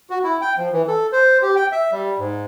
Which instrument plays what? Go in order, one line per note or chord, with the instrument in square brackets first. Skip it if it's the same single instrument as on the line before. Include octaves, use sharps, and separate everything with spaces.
[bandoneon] F#4
E4
G5
F3
E3
A4
C5
G4
G5
E5
G3
G#2